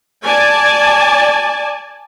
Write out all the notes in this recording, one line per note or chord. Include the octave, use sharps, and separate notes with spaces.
D5 G#5 A5